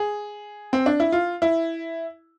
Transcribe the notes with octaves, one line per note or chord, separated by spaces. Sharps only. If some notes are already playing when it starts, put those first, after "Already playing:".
Already playing: G#4
C4
D4
E4
F4
E4